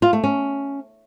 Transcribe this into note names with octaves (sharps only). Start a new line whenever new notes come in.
F4
A3
C#4